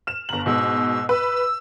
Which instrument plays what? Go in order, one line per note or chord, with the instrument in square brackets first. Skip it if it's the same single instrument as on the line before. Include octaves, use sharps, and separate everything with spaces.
[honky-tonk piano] F6 E7
[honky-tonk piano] G1 F#7 [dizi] A#5
[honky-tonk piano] G#2 B2 [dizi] E6
[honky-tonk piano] B4 [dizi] E6